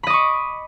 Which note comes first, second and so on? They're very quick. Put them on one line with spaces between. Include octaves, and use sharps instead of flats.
B5 D#5 D6 C#6